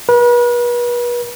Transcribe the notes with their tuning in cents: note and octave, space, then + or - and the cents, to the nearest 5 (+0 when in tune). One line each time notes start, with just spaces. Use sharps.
B4 -40